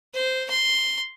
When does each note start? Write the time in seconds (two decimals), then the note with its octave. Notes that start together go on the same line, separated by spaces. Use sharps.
0.14 C5
0.50 C6